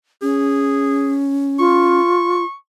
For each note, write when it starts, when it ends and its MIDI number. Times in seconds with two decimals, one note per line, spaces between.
0.22 2.00 61
0.22 1.21 68
1.59 2.44 65
1.59 2.55 85